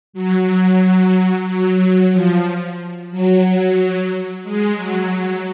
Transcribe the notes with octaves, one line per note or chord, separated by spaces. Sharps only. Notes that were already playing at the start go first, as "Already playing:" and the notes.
F#3
F#3
F3
F#3
G#3
F#3